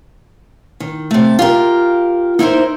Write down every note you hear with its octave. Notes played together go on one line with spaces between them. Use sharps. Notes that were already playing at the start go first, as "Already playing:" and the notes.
D#3
C3 A3
F4 G4 A#4
D#4 E4 A#4 C5